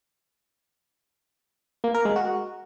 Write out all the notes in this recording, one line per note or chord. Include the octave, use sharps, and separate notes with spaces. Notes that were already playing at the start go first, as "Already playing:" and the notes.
A#3
A#4
G#3
F#4